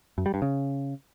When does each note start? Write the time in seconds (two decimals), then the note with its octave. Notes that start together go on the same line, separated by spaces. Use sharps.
0.18 F#2
0.26 G3
0.34 G2
0.42 C#3